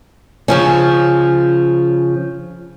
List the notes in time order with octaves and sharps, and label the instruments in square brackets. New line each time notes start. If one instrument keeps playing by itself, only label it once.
[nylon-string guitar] C#3 F3 C#4